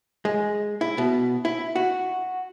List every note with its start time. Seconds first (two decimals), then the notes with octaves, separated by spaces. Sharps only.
0.25 G#3
0.81 E4
0.98 B2
1.45 E4
1.76 F#4